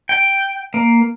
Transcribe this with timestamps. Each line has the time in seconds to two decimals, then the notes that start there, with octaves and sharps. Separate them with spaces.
0.09 G5
0.74 A#3